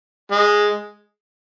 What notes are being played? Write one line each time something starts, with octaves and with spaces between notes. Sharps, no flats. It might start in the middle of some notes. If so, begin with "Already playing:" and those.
G#3